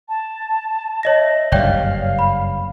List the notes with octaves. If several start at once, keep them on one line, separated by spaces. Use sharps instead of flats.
A5
C#5 D#5 A5 A#6
E5
F#1 G2 C#5 D5 F5 G5
B5